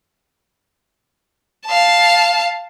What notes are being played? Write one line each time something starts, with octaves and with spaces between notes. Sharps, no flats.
F5 A5